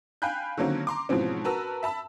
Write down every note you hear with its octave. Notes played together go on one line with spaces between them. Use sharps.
F5 G5 G#5 B5 F#6 G6
D3 D#3 F#3 A#3 C4 C#4
A#5 C6 D6
G#2 B2 E3 F3 C4 C#4
F#4 A#4 B4 A5 A#5 E6
E5 A5 B5 E6